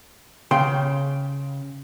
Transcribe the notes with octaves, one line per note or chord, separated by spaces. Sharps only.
C#3 G5 C6